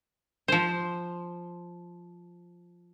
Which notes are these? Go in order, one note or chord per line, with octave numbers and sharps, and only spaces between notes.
F3 C5